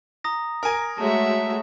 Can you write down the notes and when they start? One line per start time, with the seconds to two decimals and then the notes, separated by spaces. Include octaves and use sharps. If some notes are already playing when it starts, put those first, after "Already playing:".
0.24 A#5 D#6 A#6
0.63 A#4 G#5
0.98 G#3 A3 F#4 C#5 E5 A5